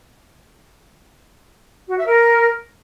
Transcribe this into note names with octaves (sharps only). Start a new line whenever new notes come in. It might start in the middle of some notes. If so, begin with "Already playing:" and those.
F#4
E5
A#4